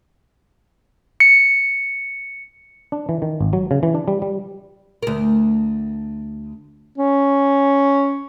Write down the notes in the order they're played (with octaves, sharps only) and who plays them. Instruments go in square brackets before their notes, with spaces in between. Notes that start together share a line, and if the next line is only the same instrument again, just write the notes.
[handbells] C#7
[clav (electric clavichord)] D4
E3
D#3
G#1
F#3
C#3
E3
D4
G3
G3
[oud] D2 A#4
[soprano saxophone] C#4